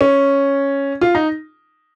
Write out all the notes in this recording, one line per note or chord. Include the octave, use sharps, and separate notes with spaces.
C#4
F4
D#4